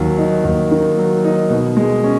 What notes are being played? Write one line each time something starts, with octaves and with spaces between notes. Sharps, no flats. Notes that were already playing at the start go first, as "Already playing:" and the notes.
Already playing: D#2 D#3 F#3
D#4
D#2
D#3
F#3
D#4
B2
G#3
C#4